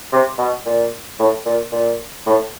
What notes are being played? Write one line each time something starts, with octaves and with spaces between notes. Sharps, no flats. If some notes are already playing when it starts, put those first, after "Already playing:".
C3
B2
A#2
A2
A#2
A#2
A2